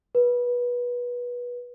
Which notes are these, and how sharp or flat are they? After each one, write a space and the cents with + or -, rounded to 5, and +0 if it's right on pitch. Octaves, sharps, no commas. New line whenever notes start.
B4 -20